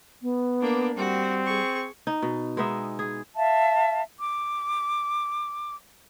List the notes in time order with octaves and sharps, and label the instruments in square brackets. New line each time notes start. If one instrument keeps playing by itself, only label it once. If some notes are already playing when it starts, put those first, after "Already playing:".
[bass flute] B3
[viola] A#3 D4
[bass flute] G3 [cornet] C4 [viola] F#4
[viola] G#4 C#6
[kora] D#4
B2
G#3 B3 D#4 E5
G#4
[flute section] E5 F5 A5
D6